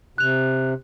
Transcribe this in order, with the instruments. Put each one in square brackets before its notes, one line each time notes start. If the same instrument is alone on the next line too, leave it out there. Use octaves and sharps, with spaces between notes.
[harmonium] C3 [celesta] F#6 F7